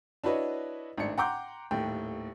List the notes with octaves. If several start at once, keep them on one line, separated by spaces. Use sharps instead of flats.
D4 E4 F#4 B4 C#5 D#5
G#1 A2 D4 C#7
F#5 G5 A#5 C6 D6 G6
D#1 D#2 A2 G5